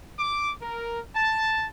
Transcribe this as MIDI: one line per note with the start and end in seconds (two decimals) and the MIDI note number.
0.19 0.52 86
0.62 1.00 70
1.15 1.64 81